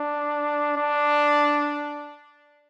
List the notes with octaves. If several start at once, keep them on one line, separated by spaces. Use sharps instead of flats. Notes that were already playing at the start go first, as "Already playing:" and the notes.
Already playing: D4
D4